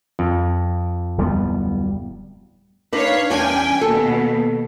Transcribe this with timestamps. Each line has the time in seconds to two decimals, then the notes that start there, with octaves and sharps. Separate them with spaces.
0.19 F2
1.18 D1 G3 B3
2.93 D4 D#4 B4 C#5 F5
3.30 E2 G3 C#4 D4 G5 G#5
3.81 D#2 B2 A4